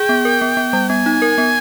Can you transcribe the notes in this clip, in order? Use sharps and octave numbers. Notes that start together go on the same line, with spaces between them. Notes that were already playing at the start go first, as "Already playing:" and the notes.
Already playing: G#4 G5
B3
A#4
B3
B3
G3
B3 G#5
D#4
A#4
B3